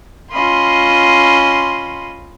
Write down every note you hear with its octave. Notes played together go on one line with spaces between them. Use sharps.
C#4 F4 D#5 B5 C6